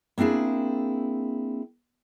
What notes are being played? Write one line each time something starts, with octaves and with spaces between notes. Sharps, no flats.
A#3 C4 D4 E4 G#4